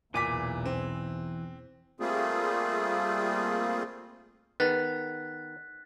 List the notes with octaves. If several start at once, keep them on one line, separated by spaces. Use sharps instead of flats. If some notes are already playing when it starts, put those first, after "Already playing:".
B1 E2 A#2 E3 G#5 D6 B6
C4
G3 A3 A#3 C4 F4 G#4
D#3 B3 D#4 G#4 B4 F#6 A6 B6